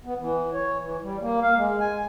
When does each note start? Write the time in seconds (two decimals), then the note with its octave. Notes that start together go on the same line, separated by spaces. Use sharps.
0.05 B3
0.20 E3
0.54 C#5
0.81 E3
1.02 G3
1.21 A#3
1.42 F5
1.56 G#3
1.80 G#5